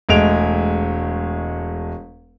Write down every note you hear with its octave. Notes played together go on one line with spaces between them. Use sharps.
E1 G#3 A3 D7 F7